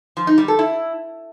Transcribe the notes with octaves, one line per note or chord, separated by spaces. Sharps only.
F3
D#4
G3
A4
E4